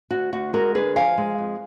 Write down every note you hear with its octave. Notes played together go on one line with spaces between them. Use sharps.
D2 F#4
D2 F#4
G#3 F#4 A#4
D3 G#4 B4
F3 F5 G#5
G#3
F2